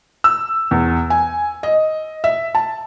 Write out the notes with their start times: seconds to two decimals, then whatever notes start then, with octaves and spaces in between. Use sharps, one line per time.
0.24 E6
0.71 E2
1.10 G#5
1.63 D#5
2.24 E5
2.55 A5